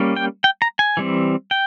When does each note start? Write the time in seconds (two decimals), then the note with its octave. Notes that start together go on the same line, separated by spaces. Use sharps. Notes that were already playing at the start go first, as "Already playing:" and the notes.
Already playing: G3 A#3 C#4
0.16 G5
0.44 G5
0.62 A#5
0.79 G#5
0.97 E3 G3 C4
1.51 G5